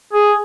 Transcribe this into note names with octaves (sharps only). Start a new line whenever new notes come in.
G#4